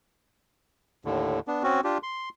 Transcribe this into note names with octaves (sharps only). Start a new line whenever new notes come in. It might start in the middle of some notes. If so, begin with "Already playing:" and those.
D#2 A2 D3
B3 D4
C4 C#4 F#4
D4 F4 G4
C6